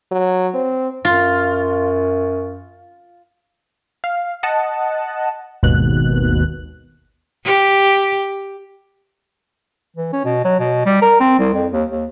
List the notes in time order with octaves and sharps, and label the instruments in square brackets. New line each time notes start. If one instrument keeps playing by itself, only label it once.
[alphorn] F#3
C4
[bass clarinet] F#2 [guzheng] F4
[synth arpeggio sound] F5
D#5 F#5 A5
G#1 D#2 B2 F#6
[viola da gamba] G4
[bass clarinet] E3
C#4
B2
F#3
B2
G3
A#4
C4
C2
F2
D#2
D#2